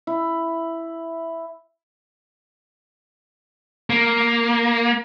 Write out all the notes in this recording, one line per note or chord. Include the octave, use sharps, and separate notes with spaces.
E4
A#3